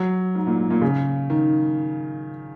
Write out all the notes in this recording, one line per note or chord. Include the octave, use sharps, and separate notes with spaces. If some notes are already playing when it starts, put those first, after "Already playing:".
Already playing: F#3
G#2
A#2
G#2
A#2
C#3
D#3